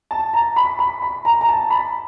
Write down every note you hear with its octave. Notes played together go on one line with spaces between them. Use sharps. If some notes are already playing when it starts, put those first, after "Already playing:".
A5
A#5
B5
B5
B5
A#5
A#5
A5
B5